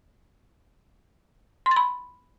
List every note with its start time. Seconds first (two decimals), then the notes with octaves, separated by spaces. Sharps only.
1.66 C6
1.71 A6
1.76 B5